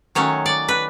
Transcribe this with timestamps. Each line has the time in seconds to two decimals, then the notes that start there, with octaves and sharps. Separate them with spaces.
0.15 D#3 F#3 A3 C#4 C#5
0.46 D5
0.68 B4